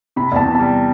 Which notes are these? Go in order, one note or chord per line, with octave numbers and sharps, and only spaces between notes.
C3 B5
E2 A5
C3
G3 A5